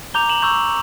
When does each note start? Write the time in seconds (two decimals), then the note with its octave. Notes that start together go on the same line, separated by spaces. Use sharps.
0.14 A#5 D6 G6 F7 G7
0.29 E7 F#7
0.42 C#6 E6 G6